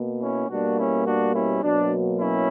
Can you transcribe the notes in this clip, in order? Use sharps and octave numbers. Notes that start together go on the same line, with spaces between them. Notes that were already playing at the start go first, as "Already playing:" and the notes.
Already playing: B2 A#3
C#4 E4
B2 G3 A#3 D4 F#4
C#4 E4
D4 F#4
C#4 E4
B2 F#3 A#3 D4
C#4 E4